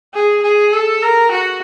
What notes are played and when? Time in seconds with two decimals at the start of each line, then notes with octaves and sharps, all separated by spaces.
0.14 G#4
0.43 G#4
0.73 A4
1.03 A#4
1.32 F#4